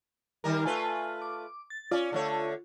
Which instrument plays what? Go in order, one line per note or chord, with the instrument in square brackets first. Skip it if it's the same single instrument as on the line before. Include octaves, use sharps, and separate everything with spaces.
[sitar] D#3 G3 A#4
[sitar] A3 F4 B4 [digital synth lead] G#5
[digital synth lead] D6
A6
[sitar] C#4 D5 [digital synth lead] F4
[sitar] D3 A3 C#5